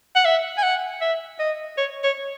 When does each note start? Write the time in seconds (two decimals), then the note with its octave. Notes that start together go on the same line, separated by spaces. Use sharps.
0.16 F#5
0.25 E5
0.58 G#5
0.63 F#5
1.01 E5
1.40 D#5
1.78 C#5
2.04 C#5